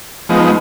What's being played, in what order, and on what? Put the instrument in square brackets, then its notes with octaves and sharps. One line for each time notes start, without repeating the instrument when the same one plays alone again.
[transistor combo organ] F3 G#3 B3 D#4